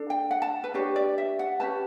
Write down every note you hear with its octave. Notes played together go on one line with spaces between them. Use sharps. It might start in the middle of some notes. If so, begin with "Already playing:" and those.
Already playing: D4 A4
G5
F#5
A5
B4
D4 G4 B4 C#5
D5
E5
F#5
C#4 G4 B4 A5